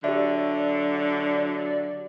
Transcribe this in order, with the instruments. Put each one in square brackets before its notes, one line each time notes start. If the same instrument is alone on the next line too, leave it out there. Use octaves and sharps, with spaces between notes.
[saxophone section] D3 F#3 [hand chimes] G4 E5 [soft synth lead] D5